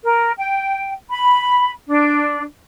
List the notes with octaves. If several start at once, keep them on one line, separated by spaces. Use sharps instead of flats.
A#4
G5
B5
D4